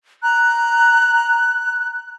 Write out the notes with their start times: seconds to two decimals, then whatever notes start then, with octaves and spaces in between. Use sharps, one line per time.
0.23 A#5 F#6